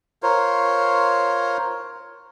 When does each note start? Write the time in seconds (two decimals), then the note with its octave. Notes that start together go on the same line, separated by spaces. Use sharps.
0.23 F4 A#4 C5 C#5